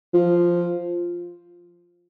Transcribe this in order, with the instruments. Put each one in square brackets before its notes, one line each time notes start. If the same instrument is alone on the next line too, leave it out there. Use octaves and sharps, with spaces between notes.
[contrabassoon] F3